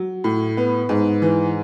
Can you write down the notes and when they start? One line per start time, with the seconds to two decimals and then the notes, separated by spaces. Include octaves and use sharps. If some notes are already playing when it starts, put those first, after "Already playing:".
Already playing: F#3
0.24 A2
0.57 B3
0.89 G#2
1.22 E3